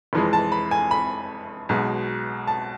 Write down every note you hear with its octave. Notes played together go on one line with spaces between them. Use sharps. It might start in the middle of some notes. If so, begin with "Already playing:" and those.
F1 F2 E3 G#3
A5
B5
G#5
B5
B1 B2 G#3
A5